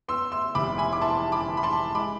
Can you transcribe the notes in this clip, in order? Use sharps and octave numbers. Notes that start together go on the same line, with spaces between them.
B3 C6 E6
C6 E6
F1 B5 D6
G#5 B5
D6
E3 A5 C6
B5 D6
E3
B5
A5 C6
G#3 B5 D6